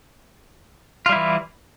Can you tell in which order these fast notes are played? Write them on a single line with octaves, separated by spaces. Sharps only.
F4 G3 E4 E3